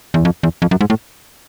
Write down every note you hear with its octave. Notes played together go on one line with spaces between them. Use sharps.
E2
F2
E2
F2
F#2
G#2
A2